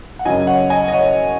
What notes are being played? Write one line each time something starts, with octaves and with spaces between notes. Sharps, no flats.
F#5
F#2 C#3 F#3 D#5 G#5
C#5 F#5
D#5 G#5
D#5
C#5 F#5